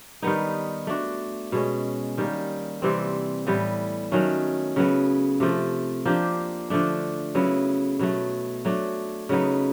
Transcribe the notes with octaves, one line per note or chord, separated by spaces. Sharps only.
D#3 G3 B3 D#4
A3 D4 F#4
B2 G#3 C#4
D#3 G3 A#3
C3 E3 G3 C4
A2 E3 G3 B3
D#3 F#3 A3 C#4
C#3 F#3 B3
C3 F3 A3
F3 A#3 D4 G4
D3 F3 A3 D4
C#3 F#3 B3 E4
B2 F#3 A3
F#3 A3 D4
C#3 F#3 B3 D#4